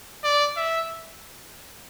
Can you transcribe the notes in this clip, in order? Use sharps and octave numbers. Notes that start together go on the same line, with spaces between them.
D5
E5